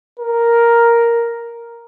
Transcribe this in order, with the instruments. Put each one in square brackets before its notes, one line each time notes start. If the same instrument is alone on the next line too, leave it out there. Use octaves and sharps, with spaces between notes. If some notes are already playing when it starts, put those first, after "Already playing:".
[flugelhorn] A#4